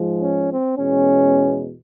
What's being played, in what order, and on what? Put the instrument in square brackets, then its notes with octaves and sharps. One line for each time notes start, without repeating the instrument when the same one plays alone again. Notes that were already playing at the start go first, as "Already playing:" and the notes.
Already playing: [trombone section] G#2 F3 G#3
C#4
C4
E2 B2 G#3 C#4